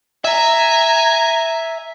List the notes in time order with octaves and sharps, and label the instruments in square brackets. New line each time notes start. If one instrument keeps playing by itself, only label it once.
[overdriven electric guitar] E5 [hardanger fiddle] G#5 A#5